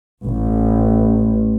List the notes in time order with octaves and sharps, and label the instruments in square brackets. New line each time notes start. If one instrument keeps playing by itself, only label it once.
[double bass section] A1